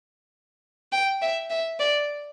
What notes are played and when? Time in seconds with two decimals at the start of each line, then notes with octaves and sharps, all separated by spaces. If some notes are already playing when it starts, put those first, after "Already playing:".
0.92 G5
1.22 E5
1.50 E5
1.80 D5